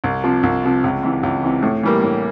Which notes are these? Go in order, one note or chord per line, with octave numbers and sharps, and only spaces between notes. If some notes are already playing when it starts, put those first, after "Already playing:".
C2
C3 F3
C2
C3 F3
C#2
C3 E3
C#2
C3 E3
A2
E3 G3 A#3
A2